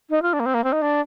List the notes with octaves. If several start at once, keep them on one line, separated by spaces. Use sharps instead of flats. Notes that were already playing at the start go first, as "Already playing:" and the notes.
D#4
F4
D4
A#3
C4
A#3
C4
D#4
D4